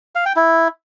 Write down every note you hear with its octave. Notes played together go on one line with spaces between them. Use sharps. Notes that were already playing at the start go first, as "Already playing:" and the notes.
F5
G5
E4